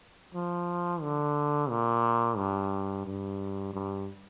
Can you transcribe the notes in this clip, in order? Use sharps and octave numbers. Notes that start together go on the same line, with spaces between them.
F3
D3
A#2
G2
G2
G2